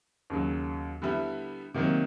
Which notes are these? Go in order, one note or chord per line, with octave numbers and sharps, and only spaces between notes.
D#2 C#3 F#3
D3 G3 B3 E4
C3 D#3 F#3 A#3